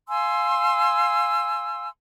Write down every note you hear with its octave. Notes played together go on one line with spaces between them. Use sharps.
F5 G#5 C6 E6